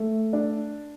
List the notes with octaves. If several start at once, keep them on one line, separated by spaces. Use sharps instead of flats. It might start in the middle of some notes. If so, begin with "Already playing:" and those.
Already playing: A3
D4